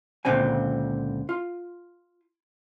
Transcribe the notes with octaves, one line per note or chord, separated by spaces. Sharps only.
C#2 A#2 D3 C4 G#5
F4